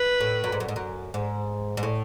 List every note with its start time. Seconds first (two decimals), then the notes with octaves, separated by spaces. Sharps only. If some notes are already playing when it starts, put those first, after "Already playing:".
Already playing: B4
0.20 A2
0.44 F#2
0.52 G#2
0.60 F#2
0.68 G#2
0.76 F#2
1.14 G#2
1.77 G#2
1.83 A2